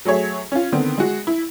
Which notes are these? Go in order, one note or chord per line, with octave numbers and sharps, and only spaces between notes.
F#3 A3 G#4 C#5 E5
C#4 F4
D3 D#3 B3 C4
G#3 F#4
E4